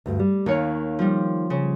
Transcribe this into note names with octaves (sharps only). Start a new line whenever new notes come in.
D2 G2
G3
D#2 D#3 C#5 F5
F3 G3
C#3